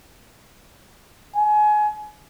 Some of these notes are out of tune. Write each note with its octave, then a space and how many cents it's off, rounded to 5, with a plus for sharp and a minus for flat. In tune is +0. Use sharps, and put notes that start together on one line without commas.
G#5 +25